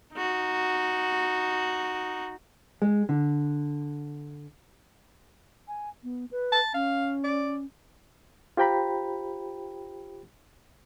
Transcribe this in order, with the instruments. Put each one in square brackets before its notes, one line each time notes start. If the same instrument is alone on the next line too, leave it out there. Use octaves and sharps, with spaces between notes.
[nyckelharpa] D#4 F#4
[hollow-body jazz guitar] G#3
D3
[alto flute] G#5
B3
B4
[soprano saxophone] A5
[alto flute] C#4 [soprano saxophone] F5
[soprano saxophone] D5
[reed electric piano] F4 G4 C5 G5 A#5 B5